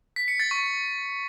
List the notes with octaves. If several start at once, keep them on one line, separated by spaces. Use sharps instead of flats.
B6
C#7
A6
C#6